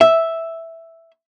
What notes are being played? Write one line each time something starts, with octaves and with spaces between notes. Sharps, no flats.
E5